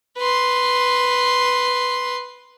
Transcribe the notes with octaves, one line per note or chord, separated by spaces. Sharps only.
B4 C6